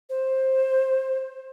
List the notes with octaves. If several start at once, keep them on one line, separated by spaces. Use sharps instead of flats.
C5